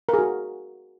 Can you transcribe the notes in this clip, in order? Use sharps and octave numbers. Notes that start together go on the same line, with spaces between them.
A#4
G#4
F#4